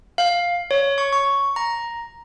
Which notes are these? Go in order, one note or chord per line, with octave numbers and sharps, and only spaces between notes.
F5
C#5
C#6
C#6
A#5